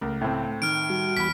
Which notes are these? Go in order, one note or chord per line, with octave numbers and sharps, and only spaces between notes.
C#2 A3 A#4
A2 C4
D#3 F6 D7
G3 F#4
E2 B5 B6